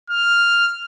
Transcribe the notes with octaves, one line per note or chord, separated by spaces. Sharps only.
F6